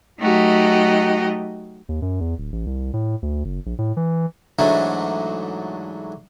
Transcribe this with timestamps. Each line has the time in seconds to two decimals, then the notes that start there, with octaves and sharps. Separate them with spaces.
0.20 F#3 A3 D#4 F#4 G4 D#5
1.89 D#2
2.02 F#2
2.20 E2
2.38 D1
2.52 A1
2.66 C2
2.93 A2
3.22 D2
3.45 F#1
3.66 A#1
3.78 A2
3.97 E3
4.59 G#2 E3 F#3 A3 D4